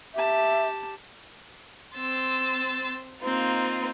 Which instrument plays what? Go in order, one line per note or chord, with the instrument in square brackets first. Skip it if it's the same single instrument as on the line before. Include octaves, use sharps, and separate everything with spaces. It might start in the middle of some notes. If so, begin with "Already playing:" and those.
[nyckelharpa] G4 A5 [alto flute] E5
[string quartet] C4 C6 E6 A6
A#3 C4 D#4 F4